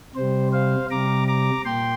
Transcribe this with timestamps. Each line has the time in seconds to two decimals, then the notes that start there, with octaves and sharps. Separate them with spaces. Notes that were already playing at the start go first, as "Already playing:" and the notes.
0.15 C3 G3 C5
0.52 C5 F5
0.90 C3 G3 A#5 D6
1.28 A#5 D6
1.65 A#2 G5 C6